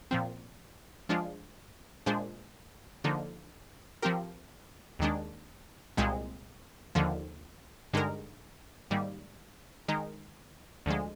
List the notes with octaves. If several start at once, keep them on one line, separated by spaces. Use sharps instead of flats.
A#2 F3 C4
F3 G#3 D4 F4
A#2 G#3 D4 G#4 C5
D3 F3 A#3 D#4
F3 C4 G4 A#4
D#2 D#3 G#3 D4
C2 A#2 G#3 C4
D#2 D3 F3
G2 D3 G#3 D#4 A#4
G#2 D#3 G3 A#3
D#3 G#3 D#4 A#4
D2 D3 F3 G#3